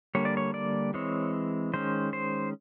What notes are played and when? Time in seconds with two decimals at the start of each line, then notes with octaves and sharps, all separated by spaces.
0.15 D3 G3 A#3 C#5
0.25 D5
0.37 C#5
0.54 D5
0.94 E3 G#3 C4 C#5
1.73 D#3 G#3 C#4 C5
2.13 C5